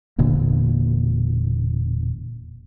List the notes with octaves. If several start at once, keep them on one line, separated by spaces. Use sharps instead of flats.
E1 A#2 D3 A#3